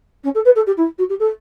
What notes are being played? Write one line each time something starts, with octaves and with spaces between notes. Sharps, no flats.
C#4
A4
B4
A4
G4
E4
F#4
G4
A4